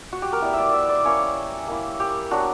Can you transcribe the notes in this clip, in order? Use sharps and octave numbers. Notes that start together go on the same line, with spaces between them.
F#4
G4
A#4
G3 B3 E4 B4
D5 E5
E5
D5
A#3 C#4 E4 C#5
A#3 E4
G4
F#3 B3 D4 F#4